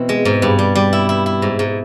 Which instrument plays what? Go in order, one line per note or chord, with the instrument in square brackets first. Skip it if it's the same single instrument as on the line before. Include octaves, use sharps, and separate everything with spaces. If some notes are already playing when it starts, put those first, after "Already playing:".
Already playing: [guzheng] B2 E3 C4
G#3
G#2
G2
G3
G3
E4
E4
E4
G#2
G#2